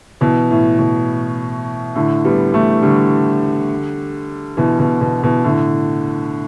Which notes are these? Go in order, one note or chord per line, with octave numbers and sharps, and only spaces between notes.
B2 E3
A2
B2
A2 D3
G3 B3
E3 A3
D3 G3
B2 E3
B2
B2
B2 E3
A2 D3